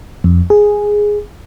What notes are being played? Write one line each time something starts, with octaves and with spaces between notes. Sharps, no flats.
F2
G#4